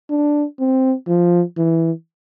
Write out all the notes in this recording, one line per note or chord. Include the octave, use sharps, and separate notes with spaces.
D4
C4
F3
E3